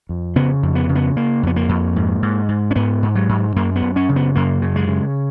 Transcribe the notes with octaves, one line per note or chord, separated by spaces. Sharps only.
F2
C#3 B3
F2
B3
C#3
B3
C#3 A#3
F2 B3
A#3
F2
G#2
G#2
G#2
C#4
G#2 B3
G#2
F#3
G#2
F#2 A#3
B3
F#2
C#4
C#3
B3
F#2 A#3
C#3
G#3
C#3